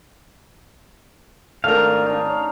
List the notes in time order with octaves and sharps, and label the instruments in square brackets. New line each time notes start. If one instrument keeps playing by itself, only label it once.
[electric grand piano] G#1 A#4 [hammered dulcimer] A3 D4 G#4 [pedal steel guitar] F5
[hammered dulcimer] A#5
D4 D#4
C#4